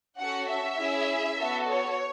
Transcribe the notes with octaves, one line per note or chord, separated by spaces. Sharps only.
C#4 F#4 A4 F#5
E5
C#4 E4 G#4
B3 F#4 A4
C#5